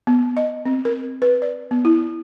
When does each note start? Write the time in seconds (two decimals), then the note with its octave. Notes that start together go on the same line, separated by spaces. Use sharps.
0.07 B3
0.37 D#5
0.66 C4
0.85 A#4
1.22 B4
1.42 D5
1.71 B3
1.85 E4